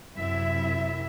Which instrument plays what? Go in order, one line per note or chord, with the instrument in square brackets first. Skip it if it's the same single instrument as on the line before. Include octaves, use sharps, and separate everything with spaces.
[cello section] F#2 C3 E4 E5